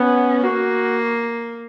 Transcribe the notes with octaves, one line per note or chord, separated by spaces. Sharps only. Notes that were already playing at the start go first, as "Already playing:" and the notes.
Already playing: B3 C#4
A#3 F#4